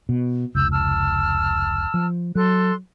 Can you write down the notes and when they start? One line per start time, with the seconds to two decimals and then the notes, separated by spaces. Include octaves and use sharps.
0.09 B2
0.55 F1 C#2 E6 G6
0.71 A5 E6 F6
1.94 F3
2.35 F#3 A4 C6 F#6